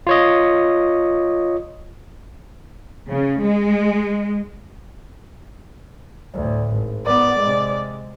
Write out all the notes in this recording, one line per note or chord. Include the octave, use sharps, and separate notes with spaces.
F4 C#5 D#5
C#3
G#3
D2 A2
G#1
B3 D5
C3 G#3